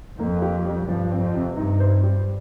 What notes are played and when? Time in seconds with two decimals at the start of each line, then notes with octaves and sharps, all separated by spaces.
0.19 F2 A#3
0.42 G4
0.65 G3
0.88 G2 F3
1.11 C4
1.22 F2
1.34 C3
1.57 G2 D#4
1.80 C5
2.03 G3